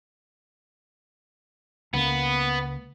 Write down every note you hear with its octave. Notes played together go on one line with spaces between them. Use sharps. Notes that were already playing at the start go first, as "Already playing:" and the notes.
C#2 A#3 B3